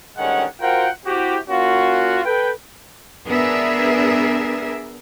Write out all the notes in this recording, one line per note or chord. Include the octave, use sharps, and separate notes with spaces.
D2 G2 D#3 G#3 C#4 F#5
F4 F#4 A#4 C5 F#5 G5
C4 E4 F#4 G4
A#3 C#4 F4 F#4
A4 B4 G5
B3 D4 G#4 A#4 E5